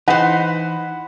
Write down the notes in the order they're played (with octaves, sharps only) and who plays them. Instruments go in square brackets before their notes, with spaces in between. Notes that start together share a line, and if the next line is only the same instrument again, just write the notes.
[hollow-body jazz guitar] E3 [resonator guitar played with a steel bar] D#4 C5 [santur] B4 [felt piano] F#5